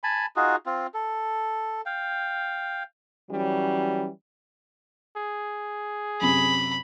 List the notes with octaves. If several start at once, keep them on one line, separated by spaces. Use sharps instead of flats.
G#5 A5 B5
D#4 F4 F#4 G#4
C4 F4
A4
F5 G5
E3 F#3 G3 C#4
G#4
F#2 C3 B5